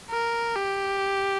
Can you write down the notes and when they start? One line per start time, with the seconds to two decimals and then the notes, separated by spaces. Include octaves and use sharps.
0.10 A#4
0.56 G4